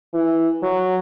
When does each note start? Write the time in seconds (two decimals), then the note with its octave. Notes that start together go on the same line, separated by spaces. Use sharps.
0.14 E3
0.63 F#3